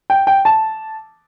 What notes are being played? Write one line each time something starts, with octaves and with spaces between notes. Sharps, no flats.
G5
G5
A5